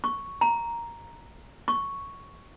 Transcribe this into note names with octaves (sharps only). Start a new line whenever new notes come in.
C#6
A#5
C#6